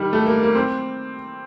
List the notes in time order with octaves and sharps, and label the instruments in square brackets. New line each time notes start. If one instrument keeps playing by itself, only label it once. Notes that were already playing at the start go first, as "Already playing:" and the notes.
Already playing: [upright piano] D#3 G3
A3
A#3
A#3
C4